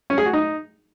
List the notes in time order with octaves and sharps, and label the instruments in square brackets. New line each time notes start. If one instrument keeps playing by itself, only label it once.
[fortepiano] C#4
G#4
F#4
D#4